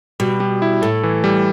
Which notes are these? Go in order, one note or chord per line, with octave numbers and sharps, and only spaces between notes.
B2 G3
G3
E4
A2 A4
E3
G3